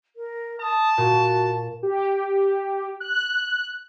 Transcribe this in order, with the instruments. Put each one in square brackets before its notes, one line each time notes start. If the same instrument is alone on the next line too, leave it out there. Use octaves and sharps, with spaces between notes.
[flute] A#4
[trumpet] A5 [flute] D#6
[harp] A#2 [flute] F#4
[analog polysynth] G4
F#6